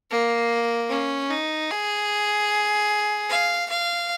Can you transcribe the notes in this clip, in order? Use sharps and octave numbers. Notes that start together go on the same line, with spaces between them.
A#3
C#4
D#4
G#4
F5
F5